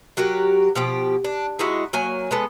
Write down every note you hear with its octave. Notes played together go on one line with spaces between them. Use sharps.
F#3 F#4 G4 A#4
B2 F3 G4
D4
G#3 D#4 E4 F#4
F#3 A#3 G#5
G#3 B3 A4